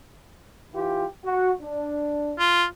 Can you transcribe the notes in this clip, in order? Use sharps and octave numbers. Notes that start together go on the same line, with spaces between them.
E3 F4 G4
F#4
D4
F4